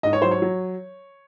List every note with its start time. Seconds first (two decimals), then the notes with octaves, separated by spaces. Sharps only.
0.03 G#2 D#5
0.13 C#5
0.22 F#3 C5
0.31 C#5
0.42 F#3